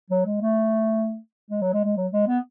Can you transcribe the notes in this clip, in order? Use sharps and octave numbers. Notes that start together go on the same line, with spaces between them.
F#3
G#3
A3
G#3
F#3
G#3
G#3
F#3
G#3
B3